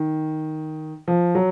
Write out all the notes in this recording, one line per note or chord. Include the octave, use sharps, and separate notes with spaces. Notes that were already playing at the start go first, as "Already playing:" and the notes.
Already playing: D#3
F3
F#3